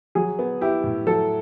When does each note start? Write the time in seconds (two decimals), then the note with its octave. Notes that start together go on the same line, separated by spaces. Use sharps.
0.15 F#3 G#4
0.39 B3
0.61 E4 G4
0.84 A2
1.06 F#3 A4